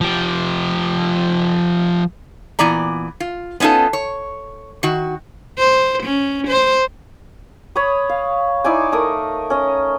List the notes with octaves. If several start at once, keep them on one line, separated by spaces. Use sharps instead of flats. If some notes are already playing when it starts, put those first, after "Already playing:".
F3 G4
A#2 E3 B3 D5 A#5
F4
B3 C#4 D#4 F4 A4
C#5
D#3 F#4
C5
C#4
C5
C#5 B5 D#6
F5
D#4 E4 D5 G#5
A3 A#4 D#6
C#4 D#5